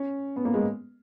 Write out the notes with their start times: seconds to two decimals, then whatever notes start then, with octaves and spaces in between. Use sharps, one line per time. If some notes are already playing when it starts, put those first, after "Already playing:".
Already playing: C#4
0.36 B3
0.45 A#3
0.54 G#3